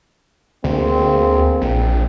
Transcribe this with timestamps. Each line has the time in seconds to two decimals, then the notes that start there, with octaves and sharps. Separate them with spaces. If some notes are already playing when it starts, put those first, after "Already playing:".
0.64 D2 A#3 C4 G#4
1.61 A#1